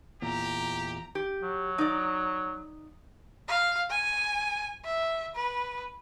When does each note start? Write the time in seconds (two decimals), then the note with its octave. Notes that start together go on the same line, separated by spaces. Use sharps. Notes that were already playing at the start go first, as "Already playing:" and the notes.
0.22 E2 A#2 G4 A#5
1.15 G4
1.43 F#3
1.78 D#4 D5
3.48 F5
3.90 G#5
4.85 E5
5.35 B4